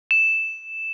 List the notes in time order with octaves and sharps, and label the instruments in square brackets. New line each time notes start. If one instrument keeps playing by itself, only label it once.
[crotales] E7